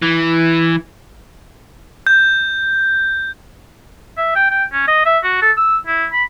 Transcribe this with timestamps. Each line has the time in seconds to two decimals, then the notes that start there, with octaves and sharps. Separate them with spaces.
0.02 E3
2.07 G6
4.17 E5
4.35 G5
4.51 G5
4.72 C#4
4.88 D#5
5.05 E5
5.23 F#4
5.42 A4
5.57 E6
5.86 E4
6.12 B5